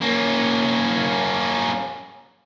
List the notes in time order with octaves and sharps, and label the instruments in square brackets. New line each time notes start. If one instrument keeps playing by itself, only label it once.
[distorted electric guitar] A#3 C#4